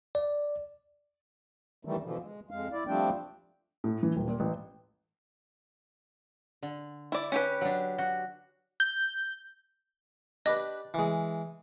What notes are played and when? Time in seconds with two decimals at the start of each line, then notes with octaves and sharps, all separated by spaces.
0.15 D5
1.85 D#3 E3 G3 A3
2.03 B2 D3 E3 F3
2.21 G#3
2.51 F2 G#3 F5
2.72 E4 D5
2.87 F3 G3 A3 C4 D4 G5
3.84 A2
4.03 E3
4.16 D#1
4.28 A#2
4.40 A1
6.63 D3
7.12 E4 D5
7.32 C#4 G4 B4
7.61 F#3 D4
7.98 F#4
8.80 G6
10.46 D4 G4 B4 D#5
10.94 E3 G#3